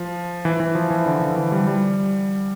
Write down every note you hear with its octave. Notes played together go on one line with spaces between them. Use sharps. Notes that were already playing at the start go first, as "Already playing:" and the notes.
Already playing: F3
E3
E3
F3
E3
D3
D3
E3
G3
G3